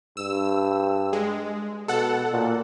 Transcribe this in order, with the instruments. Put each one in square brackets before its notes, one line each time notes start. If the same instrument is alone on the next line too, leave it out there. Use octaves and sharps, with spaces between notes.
[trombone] G2 [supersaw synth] E6
[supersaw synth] G#3
[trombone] B2 [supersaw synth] A4 F#5
[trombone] A#2